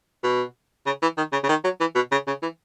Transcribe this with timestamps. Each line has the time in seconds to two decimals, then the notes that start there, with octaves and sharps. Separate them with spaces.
0.23 B2
0.86 C#3
1.02 E3
1.17 D#3
1.32 C#3
1.43 C#3
1.49 D#3
1.64 F#3
1.80 E3
1.95 B2
2.12 C#3
2.27 C#3
2.42 E3